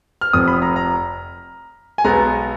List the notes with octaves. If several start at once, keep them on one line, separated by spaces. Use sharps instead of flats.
F6
F1 F2 F3 D#6
B5
A#5
A#5
G#5
B1 B2 G#3 B3 A#5